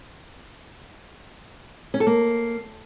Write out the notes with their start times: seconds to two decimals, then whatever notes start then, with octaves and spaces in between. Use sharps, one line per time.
1.94 C#4
2.00 A4
2.07 A#3